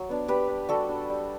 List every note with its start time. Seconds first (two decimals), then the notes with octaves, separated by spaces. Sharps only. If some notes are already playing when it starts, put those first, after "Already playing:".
Already playing: F#3
0.09 B3 D4
0.28 G3 G4 B4
0.48 D4
0.69 G3 F#4 A4
0.89 D4
1.10 G3